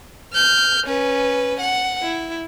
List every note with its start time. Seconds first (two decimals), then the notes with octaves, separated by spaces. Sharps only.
0.33 F6 G6
0.87 C#4 B4
1.60 F#5
2.02 E4